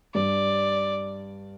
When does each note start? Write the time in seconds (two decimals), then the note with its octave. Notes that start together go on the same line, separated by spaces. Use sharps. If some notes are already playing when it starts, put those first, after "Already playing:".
0.14 G2 D5